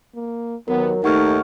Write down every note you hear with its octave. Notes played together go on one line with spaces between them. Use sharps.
A#3
D#2 F#3 B3 A#4
D#2 A3 D#4 F#5 C#6 F6